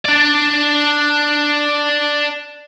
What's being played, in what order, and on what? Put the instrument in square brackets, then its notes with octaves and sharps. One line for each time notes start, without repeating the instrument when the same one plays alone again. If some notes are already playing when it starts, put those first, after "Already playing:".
[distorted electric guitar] D4 D5